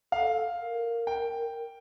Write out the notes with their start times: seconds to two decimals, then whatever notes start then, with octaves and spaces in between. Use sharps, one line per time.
0.12 A4 F5
0.60 A#4
1.07 G5